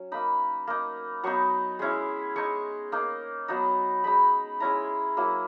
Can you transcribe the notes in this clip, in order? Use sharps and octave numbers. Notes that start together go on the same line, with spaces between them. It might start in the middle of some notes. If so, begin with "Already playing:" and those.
Already playing: F#3 C#4
A#3 D#4 B5
A#3 D#4
F#3 B3 D#4 C#6
G#3 C#4 E4
G#3 D#4 C#6
A#3 D#4
F#3 B3 D#4
G#3 D#4 B5
G#3 C#4 E4 A#5
F#3 A#3 E4